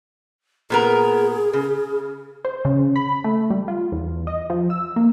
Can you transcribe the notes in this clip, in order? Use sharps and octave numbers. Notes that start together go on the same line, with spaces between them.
A#2 B3 G#4 A#4
C#3
C5
C#3
B5
A3
G3
F4
E2
D#5
F3
E6
A#3